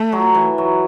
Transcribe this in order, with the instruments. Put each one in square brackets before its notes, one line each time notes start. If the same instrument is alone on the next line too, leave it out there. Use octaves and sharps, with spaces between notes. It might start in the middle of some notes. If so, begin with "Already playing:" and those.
Already playing: [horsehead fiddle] A3
[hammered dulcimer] F#3
E3
F#3